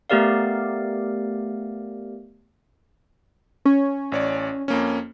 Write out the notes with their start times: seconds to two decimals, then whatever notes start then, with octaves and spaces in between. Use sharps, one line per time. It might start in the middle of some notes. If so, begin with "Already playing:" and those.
0.10 A3 B3 G4 A#4 D5 F5
3.65 C#4
4.12 A1 C#5 D5
4.68 F2 A#3 C#4